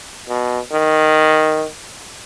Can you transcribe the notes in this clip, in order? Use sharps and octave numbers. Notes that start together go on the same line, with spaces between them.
B2
D#3